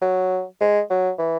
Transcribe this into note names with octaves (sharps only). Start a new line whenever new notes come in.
F#3
G#3
F#3
E3